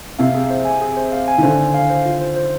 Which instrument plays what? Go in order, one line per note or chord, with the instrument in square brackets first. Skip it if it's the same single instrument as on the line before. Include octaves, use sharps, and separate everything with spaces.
[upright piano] C3 [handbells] F5
[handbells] G#4
C5
G#5
G#4
C5
F5
G#5
[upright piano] D#3
[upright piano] D3 [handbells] C5
[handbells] G#5
F5
C5
F4
C5
C5